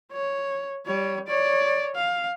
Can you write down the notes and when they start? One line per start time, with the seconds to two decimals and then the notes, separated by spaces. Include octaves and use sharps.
0.12 C#5
0.86 G3 C#5
1.28 C#5 D5
1.96 F5